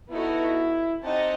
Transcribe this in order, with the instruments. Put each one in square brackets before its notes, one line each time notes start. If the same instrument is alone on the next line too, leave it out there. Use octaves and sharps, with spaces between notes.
[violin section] B3 D#4 F#4 A4 [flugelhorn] E4
[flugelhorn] C4 [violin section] D#4 G4 D#5 F#5 A5